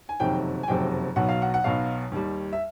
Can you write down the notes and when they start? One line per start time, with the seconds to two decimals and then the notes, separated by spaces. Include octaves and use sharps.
0.09 G#5
0.20 F#1 F2 C3 D#3 F#3 G5
0.63 G#5
0.68 F#1 F2 C3 D#3 F#3 G5
1.16 B1 B2 F#3 F#5
1.29 F5
1.42 F#5
1.54 F#5
1.64 B1 B2 F#3 F5
2.12 D#2 D#3 G3
2.53 E5